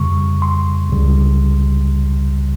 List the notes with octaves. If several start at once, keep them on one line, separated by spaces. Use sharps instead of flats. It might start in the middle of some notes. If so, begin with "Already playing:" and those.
Already playing: F2 C#3 G3 C#6
C6
C#2 C#3 G3